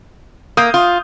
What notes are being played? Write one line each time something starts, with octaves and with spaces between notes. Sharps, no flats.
A#3 D#6 G6 C7
F4